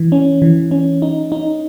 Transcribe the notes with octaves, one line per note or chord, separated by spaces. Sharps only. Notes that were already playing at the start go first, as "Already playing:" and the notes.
Already playing: E3
C#4
E3
C#4
D#4
D#4